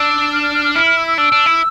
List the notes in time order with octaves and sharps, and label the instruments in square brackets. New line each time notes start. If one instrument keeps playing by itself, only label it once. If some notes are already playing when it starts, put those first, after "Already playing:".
Already playing: [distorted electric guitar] D4 [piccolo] E6
[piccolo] F6
F6
F6
F6
[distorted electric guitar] E4 [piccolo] F6
[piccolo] F6
E6
E6
[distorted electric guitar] D4 [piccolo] E6
[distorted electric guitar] D4
E4